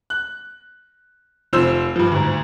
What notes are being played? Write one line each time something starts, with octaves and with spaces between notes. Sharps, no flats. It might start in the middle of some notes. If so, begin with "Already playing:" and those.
F#6
F1 F3 C5 E6 E7
G2 F3
D2 G#2